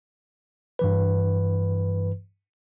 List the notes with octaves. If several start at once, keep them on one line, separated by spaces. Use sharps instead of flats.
G2 E3 B4